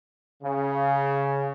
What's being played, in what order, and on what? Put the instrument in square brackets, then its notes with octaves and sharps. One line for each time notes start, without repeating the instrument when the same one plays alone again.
[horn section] C#3